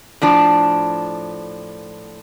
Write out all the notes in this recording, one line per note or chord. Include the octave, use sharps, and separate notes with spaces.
A2 F3 D4